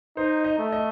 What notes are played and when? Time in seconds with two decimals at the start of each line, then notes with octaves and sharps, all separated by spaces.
0.17 D#4 C5
0.44 D#5
0.59 A3
0.72 D#5